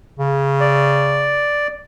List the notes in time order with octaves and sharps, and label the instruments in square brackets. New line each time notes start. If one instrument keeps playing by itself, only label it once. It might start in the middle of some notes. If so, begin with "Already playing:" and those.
[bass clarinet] C#3
[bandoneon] D5